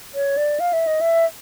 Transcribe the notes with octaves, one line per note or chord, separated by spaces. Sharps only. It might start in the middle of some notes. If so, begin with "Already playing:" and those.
C#5
D5
F5
E5
D#5
E5